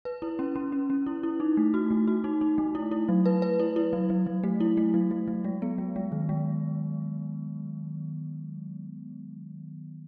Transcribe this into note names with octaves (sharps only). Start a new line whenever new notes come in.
B4
E4
C#4
C#4
C#4
C#4
E4
E4
D#4
A3
F#4
A3
F#4
D#4
D#4
A3
E4
E4
F#3
B4
B4
E4
E4
F#3
F#3
F#3
A3
E4
A3
F#3
F#3
F#3
G#3
B3
G#3
G#3
D#3
G#3